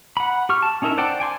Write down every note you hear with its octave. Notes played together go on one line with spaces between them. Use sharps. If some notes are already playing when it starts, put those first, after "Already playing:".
F#5 B5
G4 C#6 F6
A5
C#4 D#4 E4 A#4 E5
C5 D5 F#5 G5 A5
G5 G#5 C6 D6